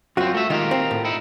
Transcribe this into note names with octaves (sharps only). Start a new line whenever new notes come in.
F#2 C4 F4 F#4
A3 E5
D#3 G#3 F4 G4 A#4
C4
A2
D#4 E4